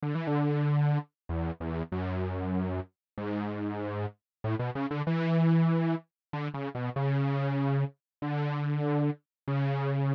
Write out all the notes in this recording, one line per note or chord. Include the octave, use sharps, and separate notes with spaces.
D3
E3
D3
E2
E2
F#2
G#2
A2
B2
C#3
D3
E3
D3
C#3
B2
C#3
D3
C#3